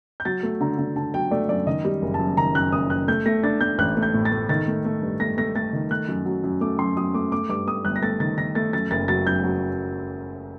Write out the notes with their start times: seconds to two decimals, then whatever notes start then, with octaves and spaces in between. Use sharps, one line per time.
0.20 G6
0.25 F#3 A6
0.43 A3
0.61 D3 A#5
0.78 D3
0.96 D3 A5
1.14 F#3 G5
1.31 A3 D5
1.49 F#2 D5
1.67 D#3 D#5
1.85 G3
2.02 F#1
2.14 A5
2.19 F#2
2.37 D#3 A#5
2.55 F#2 F#6
2.72 F#1 D#6
2.90 F#1 F#6
3.08 A3 G6
3.26 A3 A#6
3.43 D4 A6
3.61 A3 G6
3.78 A1 F#6
3.97 A3
4.02 G6
4.14 A2
4.25 A6
4.31 A3
4.49 D#3 A6
4.67 A3
4.85 A3
5.02 G2
5.20 A3 A#6
5.38 A3 A#6
5.55 A3 A6
5.73 D#3
5.91 A3 F#6
6.08 F#2
6.26 F#3
6.44 F#2
6.61 A3 D6
6.79 F#2 C6
6.97 F#2 D#6
7.14 A3 D6
7.32 A3 D6
7.49 G2 D6
7.67 A3 D#6
7.85 G1 F#6
7.96 A#6
8.02 A3 A6
8.20 D#3 A6
8.38 D#3 A#6
8.55 A3 A6
8.73 F#2 A6
8.91 F#1 A6
9.08 F#3 A6
9.26 F#2 G6
9.44 F#3